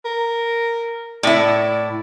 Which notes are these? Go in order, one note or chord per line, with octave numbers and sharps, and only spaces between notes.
A#4
A2 E4 D5